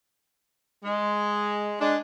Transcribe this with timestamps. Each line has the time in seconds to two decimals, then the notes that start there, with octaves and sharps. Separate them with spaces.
0.84 G#3
1.80 G#3 D4